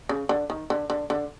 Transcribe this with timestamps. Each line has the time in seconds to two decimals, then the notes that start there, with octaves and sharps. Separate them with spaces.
0.09 C#3
0.29 D3
0.50 D#3
0.70 D3
0.90 D3
1.10 D3